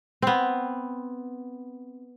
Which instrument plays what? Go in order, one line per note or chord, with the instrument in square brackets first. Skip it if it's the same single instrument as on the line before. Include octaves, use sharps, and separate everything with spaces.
[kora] B3 C4